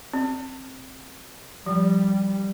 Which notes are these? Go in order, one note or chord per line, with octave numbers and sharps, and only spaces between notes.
C4
F3 G3